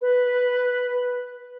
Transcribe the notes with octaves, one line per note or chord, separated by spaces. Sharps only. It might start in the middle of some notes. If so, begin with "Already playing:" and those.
B4